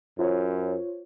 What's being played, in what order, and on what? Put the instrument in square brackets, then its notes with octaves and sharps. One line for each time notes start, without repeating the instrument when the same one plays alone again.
[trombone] F#2 [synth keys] F4 C5 C#5